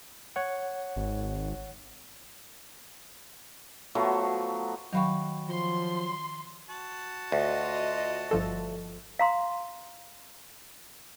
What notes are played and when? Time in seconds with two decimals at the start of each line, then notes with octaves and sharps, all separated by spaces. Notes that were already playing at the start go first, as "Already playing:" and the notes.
0.36 C#5 F#5
0.96 G#1
3.95 F3 F#3 A3 B3
4.93 D#3 F#3 F5 G5 B5 C#6
5.49 F3 C6
6.69 F#4 A5
7.32 D2 F4 D#5
8.31 G1 F3 A4
9.19 F5 A#5 C6